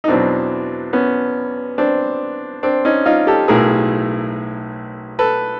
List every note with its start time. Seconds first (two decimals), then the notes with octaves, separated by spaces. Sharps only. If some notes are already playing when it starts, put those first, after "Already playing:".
0.04 D#4
0.08 E2 B2 F#3 C4 D4
0.93 B3 C#4
1.78 C4 D4
2.63 C4 D4
2.85 C#4 D#4
3.06 D#4 F4
3.27 G4 A4
3.48 B1 A2 F#3 G#4 A#4
5.19 A4 B4